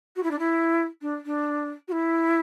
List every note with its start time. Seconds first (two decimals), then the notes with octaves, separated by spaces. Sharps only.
0.16 F#4
0.23 E4
0.31 D4
0.39 E4
1.02 D4
1.25 D4
1.88 F#4
1.92 E4